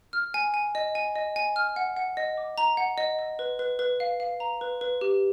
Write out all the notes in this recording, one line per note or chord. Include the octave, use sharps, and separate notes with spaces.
F6
G#5
G#5
D#5
G#5
D#5
G#5
F6
F#5
F#5
D#5
D6
A#5
F#5
D#5
D#5
B4
B4
B4
F5
F5
A#5
B4
B4
G4